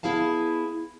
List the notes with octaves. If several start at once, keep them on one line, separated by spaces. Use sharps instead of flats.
B3 E4 G#4 F5 A5